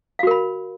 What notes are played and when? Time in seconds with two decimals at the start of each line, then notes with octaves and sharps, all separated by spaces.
0.19 F5
0.23 F#4
0.27 A#4
0.31 B5